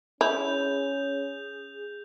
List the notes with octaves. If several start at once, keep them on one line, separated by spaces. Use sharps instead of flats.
C#4 E4 G#4 G6 F7